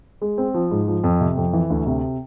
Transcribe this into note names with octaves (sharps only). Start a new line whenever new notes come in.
G#3
C4
F3
G#2
F3
F2
C3
F2
E3
D2
C3